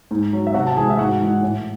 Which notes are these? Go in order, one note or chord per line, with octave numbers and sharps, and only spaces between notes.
G#2
F#3
E5
C3 F#4 F#5
A5
E3 G#3 G#4 G#5
E5
G#2 F#4 F#5
E3 G#3
A2